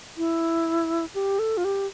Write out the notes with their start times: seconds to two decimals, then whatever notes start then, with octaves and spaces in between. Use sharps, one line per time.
0.17 E4
1.15 G4
1.39 A4
1.57 F4
1.65 G4